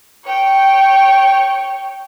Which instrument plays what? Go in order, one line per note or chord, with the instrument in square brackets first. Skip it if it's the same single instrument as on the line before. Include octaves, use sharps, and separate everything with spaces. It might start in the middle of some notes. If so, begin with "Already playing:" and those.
[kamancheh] C#5 G5